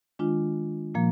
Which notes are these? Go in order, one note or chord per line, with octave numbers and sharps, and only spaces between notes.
D#3 G#3 D4 F4
A#2 F3 A#3